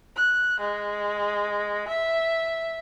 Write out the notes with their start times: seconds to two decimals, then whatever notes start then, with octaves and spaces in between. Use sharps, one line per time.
0.16 F#6
0.60 G#3
1.88 E5